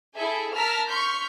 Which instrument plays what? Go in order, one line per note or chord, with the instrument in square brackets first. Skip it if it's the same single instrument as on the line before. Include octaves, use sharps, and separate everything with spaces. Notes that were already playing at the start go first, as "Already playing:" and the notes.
[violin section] E4 G#4 A4 E5 G#5
A#4 A5 A#5 E6 F6 B6
C6 C#6 F6 G6 B6